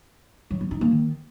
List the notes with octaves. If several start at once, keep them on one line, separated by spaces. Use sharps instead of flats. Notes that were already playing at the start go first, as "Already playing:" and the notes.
F#3
B3
D#4
A#3
D#3